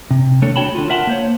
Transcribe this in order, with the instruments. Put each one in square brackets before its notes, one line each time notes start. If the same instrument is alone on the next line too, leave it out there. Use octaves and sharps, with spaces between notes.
[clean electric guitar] C3
D#2 A3 D4 A4 C#5
D4 F#4 C#5 G5 A5 B5
D3 F4
A#4 E5 F#5 G#5 A5 C6
A#3 C5 C#5